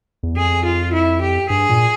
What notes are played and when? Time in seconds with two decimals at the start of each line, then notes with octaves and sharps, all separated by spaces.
0.23 E2
0.36 F2 G#4
0.65 F4
0.93 E4
1.21 G4
1.50 G2 G#4
1.69 A#2